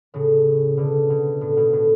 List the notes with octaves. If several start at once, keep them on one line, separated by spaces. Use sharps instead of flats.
A2 C#3
B2 D3
B2
A2
B2
A2